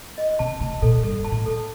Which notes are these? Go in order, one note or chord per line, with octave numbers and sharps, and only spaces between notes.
D#5
C3 A5
C3 A5
A#2 A4
G2 A4
A5
A2
A4